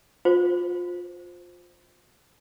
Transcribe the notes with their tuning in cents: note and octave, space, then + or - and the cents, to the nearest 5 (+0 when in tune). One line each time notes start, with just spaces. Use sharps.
F4 +20 C5 +0